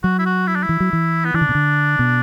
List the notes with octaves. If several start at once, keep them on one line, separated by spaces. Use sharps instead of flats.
F#3 F#4
E4
F#4
E4
D4
E4
E3
F#3
E3
B3
E3 D4
D3
B2
D3
B2